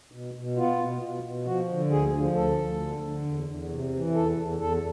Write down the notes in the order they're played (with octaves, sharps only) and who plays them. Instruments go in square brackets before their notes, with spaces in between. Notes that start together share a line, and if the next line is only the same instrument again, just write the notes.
[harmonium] B2
B2
B3 F4
B2
B2
B2
F3 F#4
D3
D2 G#4
F3
D2 A4
D2
D3
D3
E2
E2
C3
E3
E2 A4
E2
E2 A4